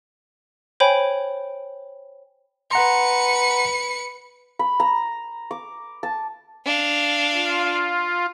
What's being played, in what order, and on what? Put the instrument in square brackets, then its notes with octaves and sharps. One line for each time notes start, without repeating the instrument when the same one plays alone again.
[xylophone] C5 C#5 G5 G#5 B5
[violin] B4 C#7 [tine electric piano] F#5 A#5 C6
[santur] B5
A#5
D6
A5
[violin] D4 F5
[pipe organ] F4